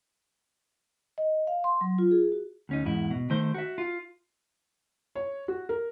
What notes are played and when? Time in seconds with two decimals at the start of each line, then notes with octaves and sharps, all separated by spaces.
1.18 D#5
1.47 F5
1.64 C6
1.81 F#3
1.98 F4
2.11 G#4
2.32 F#4
2.69 D2 C#4 D#4
2.85 E2 G#2 E4
3.11 B2
3.30 D#3 A3 C5
3.54 F#4 E5
3.78 F4
5.15 C#5
5.48 F#4
5.69 A#4